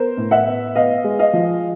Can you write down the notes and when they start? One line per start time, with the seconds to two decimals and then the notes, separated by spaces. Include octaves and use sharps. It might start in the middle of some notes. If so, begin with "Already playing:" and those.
Already playing: B3 A#4 C5
0.17 A2
0.31 E5 F#5
0.46 B3
0.75 B3 D#5 F5
1.04 G#3
1.19 D#5 F5
1.33 F3